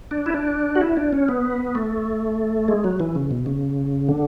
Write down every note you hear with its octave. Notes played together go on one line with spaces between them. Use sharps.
D4
E4
D4
F#4
E4
D4
C#4
B3
A3
G#3
F#3
E3
C#3
B2
C#3
D3